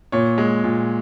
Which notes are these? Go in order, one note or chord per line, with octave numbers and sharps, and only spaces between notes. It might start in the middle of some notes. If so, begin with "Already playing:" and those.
A#2 C#5
G#3
A#2